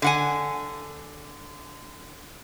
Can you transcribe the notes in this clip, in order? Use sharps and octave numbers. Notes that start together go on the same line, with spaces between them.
D3 F#5 G#5